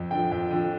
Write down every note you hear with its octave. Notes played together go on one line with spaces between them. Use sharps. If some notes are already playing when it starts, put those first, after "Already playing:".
Already playing: F2
D3 F3 G5
F2 G5
D3 F3